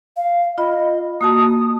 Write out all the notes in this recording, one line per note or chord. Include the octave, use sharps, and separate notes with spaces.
F5
F4 D#5 B5
A#3 F#4 A5 D#6